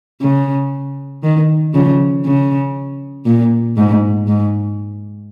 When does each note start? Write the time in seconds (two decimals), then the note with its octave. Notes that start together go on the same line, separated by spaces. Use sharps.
0.21 C#3
1.23 D#3
1.74 C#3 F3
2.25 C#3
3.26 A#2
3.77 G#2
4.27 G#2